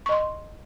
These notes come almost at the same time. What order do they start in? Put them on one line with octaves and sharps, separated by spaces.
C#6 D#5 C6